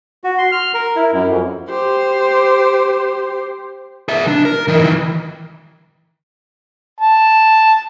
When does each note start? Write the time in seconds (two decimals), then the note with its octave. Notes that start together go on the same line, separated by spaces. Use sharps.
0.24 F#4
0.38 C6
0.52 F6
0.74 A#4
0.96 E4
1.12 F#2
1.29 F2
1.69 G4 C5
4.08 G#4 E5
4.28 D4
4.45 A#4
4.68 E3 D#4
4.81 D#3 E3
7.01 A5